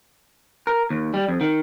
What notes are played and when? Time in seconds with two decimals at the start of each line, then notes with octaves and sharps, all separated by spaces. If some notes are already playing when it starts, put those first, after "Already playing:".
0.67 A#4
0.90 D#2
1.14 G3
1.28 F2
1.41 D#3